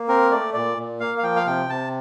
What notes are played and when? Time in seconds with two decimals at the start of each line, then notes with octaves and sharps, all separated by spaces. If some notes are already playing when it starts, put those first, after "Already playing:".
Already playing: A#3
0.08 C4 A#4
0.32 A3 D5
0.54 A#2 D5
0.77 A#2
1.00 A#3 F5
1.18 F5
1.23 F3 G5
1.36 F5
1.47 C3 G5
1.69 C3 A5